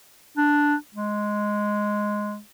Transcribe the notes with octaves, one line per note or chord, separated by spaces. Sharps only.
D4
G#3